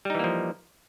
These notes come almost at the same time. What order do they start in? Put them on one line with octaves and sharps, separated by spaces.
G3 D#4 E3 A#3 F3